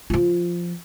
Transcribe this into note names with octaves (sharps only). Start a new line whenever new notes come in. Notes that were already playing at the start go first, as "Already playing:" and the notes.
F3 F4